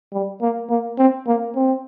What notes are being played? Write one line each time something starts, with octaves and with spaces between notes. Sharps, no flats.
G3
A#3
A#3
C4
A#3
C4